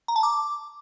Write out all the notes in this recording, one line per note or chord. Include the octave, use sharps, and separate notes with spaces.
A#5
A5
D6